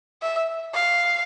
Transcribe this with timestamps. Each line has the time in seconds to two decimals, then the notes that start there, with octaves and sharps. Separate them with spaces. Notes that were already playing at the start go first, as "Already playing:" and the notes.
0.22 E5
0.74 F5